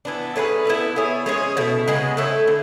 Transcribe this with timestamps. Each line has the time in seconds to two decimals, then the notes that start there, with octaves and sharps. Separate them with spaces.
0.05 E3 B3 D4
0.36 A3 C#4 G#4 B4
0.65 B3 E4 A4 D5
0.96 B3 E4 G#4 C#5
1.26 G#3 C#4 G#4 C#5
1.57 B2 A3 E4
1.88 C#3 G#3 B3
2.17 A3 E4 A4 C#5
2.47 D3